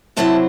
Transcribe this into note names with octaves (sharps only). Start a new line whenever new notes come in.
C3 F#3 C4 E4 A5